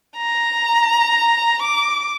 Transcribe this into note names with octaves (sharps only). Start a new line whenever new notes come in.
A#5
D6